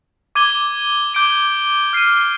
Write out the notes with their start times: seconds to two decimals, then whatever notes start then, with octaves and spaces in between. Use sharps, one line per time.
0.35 D6 G#6 D#7 G7
1.14 D6 G6 D7 G7
1.93 F6 C7 D#7